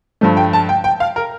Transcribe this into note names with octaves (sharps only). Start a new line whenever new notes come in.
G2 F3 A3
G5
A5
G5
G5
F5
A#4